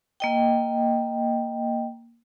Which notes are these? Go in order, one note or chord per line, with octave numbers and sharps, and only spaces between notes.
A#3 D#5 G5